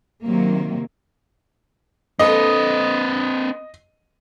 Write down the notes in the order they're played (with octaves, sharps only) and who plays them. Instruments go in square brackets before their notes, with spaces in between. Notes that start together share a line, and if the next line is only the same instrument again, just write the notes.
[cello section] C3 D#3 F#3 A#3
[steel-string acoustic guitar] A#3 D4 A4 [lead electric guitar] C4 B4 [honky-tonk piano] D#5